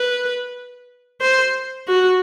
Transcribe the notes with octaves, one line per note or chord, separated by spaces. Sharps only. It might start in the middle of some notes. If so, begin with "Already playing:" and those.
Already playing: B4
C5
F#4